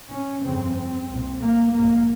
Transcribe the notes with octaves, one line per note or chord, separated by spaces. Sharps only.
C#4
G1 F2 C#3 C4
C4
C2 A#2
A#3
A#1 G#2 A#3